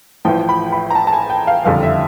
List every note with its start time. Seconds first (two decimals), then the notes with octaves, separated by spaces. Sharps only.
0.25 A1 A2 F3 G5
0.49 B5
0.72 B5
0.90 A#5
0.95 A5
1.07 A5
1.13 G#5
1.30 G5
1.47 F5
1.65 F#1 F2 D3 G3 F5
1.83 E5